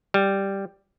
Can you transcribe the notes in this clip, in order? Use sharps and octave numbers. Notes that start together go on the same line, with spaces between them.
G3